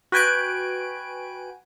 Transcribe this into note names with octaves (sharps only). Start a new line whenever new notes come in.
F#4 B4 G5 G#5 F#6 D7